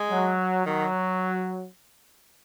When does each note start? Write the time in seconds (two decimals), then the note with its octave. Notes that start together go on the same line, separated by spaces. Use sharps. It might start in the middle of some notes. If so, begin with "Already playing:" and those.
Already playing: G#3
0.10 F#3
0.66 D#3 F#3